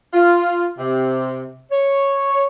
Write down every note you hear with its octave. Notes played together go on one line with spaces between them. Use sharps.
F4
C3
C#5